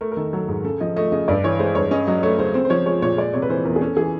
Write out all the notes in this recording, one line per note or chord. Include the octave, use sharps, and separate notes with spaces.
A3 A#4
A#4
D#3 A4
F#3 A4
G#2
C#3 A4
F3 D#5
A3 D#5
C#3 D#5
G2 D5
E3 C#5
G#3 C5
G2 C#5
C#4 D#5
F#3 D#5
A3 C#5
C#3 C5
C4 C5
C5
F3 C#5
G#3 C#5
A#2 C#5
G#3 D5
C3 C#5
B4
E3 C5
E2 A#4
G#4
C#4 A4
E3 G#4